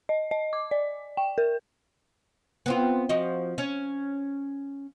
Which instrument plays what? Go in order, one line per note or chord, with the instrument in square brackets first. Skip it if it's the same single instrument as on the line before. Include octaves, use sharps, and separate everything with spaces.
[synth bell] D#5
D#5
D6
D5
G5
A#4
[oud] B3 C4 F4
F3 F#4 D#5
C#4